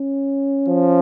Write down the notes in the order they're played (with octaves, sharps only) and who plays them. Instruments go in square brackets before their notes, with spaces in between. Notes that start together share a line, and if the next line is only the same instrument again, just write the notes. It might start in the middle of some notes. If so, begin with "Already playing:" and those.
Already playing: [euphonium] C#4
[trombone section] F3